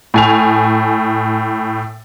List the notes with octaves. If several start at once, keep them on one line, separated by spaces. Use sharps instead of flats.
A2 G#5 F7